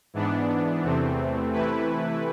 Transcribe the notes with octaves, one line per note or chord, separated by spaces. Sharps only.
G#2 E3 B3 D4
E2 C3 E3 A3 C4
C3 E3 A3 E4 B4